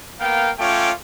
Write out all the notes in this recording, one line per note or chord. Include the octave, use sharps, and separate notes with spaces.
A#3 B3 A#4 F5 G5
A3 C#4 F4 C#5 G5 D6